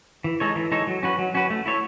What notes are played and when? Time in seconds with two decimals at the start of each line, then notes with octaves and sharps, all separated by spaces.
0.24 E3
0.40 G#3 D#4 A4 C#5
0.56 E3
0.72 G#3 D#4 A4 C#5
0.87 F#3
1.03 C#4 F#4 B4
1.19 F#3
1.34 C#4 F#4 B4
1.50 A3
1.66 E4 A4 C#5